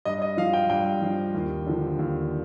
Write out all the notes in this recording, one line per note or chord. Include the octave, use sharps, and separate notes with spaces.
G2 D#5
D#5
F3 F5
G5
G2 G5
F3
D#2
D3 F3
D#2